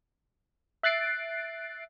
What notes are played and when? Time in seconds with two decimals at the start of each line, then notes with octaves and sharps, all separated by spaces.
0.83 E5 F#6 A6 C7 D7